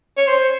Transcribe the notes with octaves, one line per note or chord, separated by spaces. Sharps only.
C#5
C5